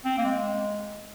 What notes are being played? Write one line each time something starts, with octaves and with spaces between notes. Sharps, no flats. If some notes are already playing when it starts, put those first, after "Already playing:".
C4
A#3
G#3